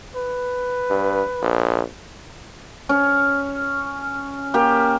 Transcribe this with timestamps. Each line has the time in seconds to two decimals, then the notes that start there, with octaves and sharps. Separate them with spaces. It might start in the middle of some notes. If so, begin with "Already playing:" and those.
0.15 B4
0.90 G2
1.42 A#1
2.89 C#4
4.54 A#3 G4